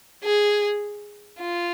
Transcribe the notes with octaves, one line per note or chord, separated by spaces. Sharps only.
G#4
F4